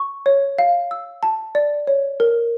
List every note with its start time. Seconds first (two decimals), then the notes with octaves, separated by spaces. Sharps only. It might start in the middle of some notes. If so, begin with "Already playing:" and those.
Already playing: C#6
0.26 C#5
0.58 F5
0.91 E6
1.23 A5
1.55 D5
1.87 C#5
2.20 A#4